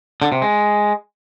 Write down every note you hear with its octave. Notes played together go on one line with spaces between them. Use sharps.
D3
C3
G#3